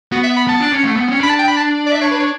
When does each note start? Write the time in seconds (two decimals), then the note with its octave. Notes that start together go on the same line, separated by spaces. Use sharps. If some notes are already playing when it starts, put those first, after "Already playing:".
0.12 B3 F#4
0.24 E5
0.36 B5
0.47 B3 A5
0.60 D4
0.73 C#4
0.84 A3
0.97 B3
1.08 C#4
1.20 D4 B5
1.29 A5
1.39 G5
1.48 B5
1.57 A5
1.86 D5
1.92 E5
2.02 C#5
2.11 B4
2.20 C#5